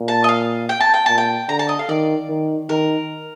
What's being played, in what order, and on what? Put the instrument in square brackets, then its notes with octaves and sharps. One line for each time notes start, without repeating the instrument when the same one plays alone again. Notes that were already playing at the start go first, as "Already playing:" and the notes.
Already playing: [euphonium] A#2
[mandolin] A5
D#5
F5
G5
A5
G5
[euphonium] A#2 [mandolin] A5
[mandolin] G5
[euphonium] D3 [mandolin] A#5
[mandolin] A5
D#5
F5
[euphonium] D#3 [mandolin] D5
[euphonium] D#3
[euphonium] D#3 [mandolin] A#4